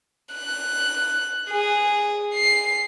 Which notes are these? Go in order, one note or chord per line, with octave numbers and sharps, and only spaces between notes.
F#6
G#4
C7